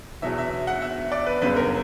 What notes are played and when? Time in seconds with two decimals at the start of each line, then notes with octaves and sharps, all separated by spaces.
0.22 E2 B2 F#3 E5
0.38 E5
0.67 F#5
0.82 E5
1.12 D5
1.26 B4
1.42 G1 F#2 C#3 B4
1.56 A#4